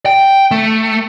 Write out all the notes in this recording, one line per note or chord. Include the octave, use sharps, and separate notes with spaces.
G5
A3